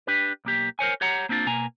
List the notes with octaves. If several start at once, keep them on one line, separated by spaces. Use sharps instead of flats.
D4 G4 B4
B1 A#3 G4
A#4 C5 C#5 G#5
G4 C#5 F#5 A#5
A#3 C4 D4 D#4 F4
B2 A#3 G#5 A#5